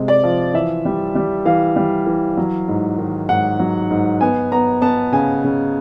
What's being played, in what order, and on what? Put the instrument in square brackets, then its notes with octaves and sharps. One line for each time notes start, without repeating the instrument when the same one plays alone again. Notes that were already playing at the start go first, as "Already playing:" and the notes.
Already playing: [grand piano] C3 G#3
D5
F3
E3 E5
G3
G3
E3 F5
G3
E3
F#3
G#2
D#3
G#2 F#5
F#3
G#2
B3 G#5
B3 A#5
B3 A5
C#3 G#5
C#3